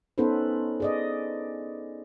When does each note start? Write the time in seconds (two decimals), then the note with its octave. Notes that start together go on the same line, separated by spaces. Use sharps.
0.18 B3 C#4 D#4 A4 B4 C5
0.80 G#4 D5 D#5